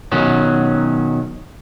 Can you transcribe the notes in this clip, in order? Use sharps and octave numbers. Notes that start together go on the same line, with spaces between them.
B2 D#3 F#3 C#4